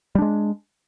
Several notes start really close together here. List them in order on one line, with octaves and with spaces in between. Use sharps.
G3 D4 G#3